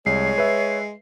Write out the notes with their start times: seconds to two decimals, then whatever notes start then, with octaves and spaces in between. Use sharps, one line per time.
0.06 C2 G#3 C#5 C7
0.38 B4 E5